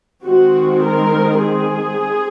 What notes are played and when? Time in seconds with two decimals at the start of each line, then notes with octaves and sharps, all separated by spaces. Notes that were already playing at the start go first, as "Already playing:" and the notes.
0.25 D#3 G#3 C4 F#4
0.83 A#4
1.40 G#4